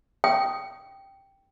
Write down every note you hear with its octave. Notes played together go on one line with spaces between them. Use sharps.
G5